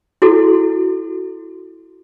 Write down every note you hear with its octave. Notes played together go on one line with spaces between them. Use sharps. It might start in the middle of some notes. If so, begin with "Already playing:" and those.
E4 F#4 A4